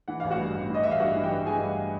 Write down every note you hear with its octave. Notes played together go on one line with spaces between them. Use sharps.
E3 F#5
A1 F5
F#4 F#5
G2
A1
E3 D#5
A1 E5
F5
G2 F#4 F#5
E3
G4 G5
G2
E3 G#4 G#5
G2